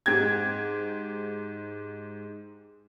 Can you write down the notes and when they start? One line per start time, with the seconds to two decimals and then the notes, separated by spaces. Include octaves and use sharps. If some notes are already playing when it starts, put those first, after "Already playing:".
0.06 G#2 G4 G#6